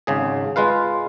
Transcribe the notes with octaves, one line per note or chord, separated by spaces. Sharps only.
G#1 C#3 G#4
G#3 F4 B4 F5